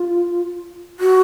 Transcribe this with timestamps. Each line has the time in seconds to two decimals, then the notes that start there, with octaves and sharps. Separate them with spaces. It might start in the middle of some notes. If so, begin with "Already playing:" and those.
Already playing: F4
1.00 F#4